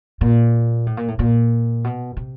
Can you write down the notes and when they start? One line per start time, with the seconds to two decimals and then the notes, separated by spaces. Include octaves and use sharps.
0.21 A#2
0.87 A2
0.97 A#2
1.08 A2
1.19 A#2
1.84 B2
2.17 C3